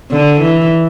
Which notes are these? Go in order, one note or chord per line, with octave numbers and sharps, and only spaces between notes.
D3
E3